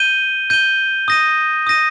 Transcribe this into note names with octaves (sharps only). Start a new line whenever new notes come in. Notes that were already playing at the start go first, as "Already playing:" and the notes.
Already playing: G6 D#7 G7
G6 D#7 G7
D#6 A#6 D#7
D#6 A#6 D#7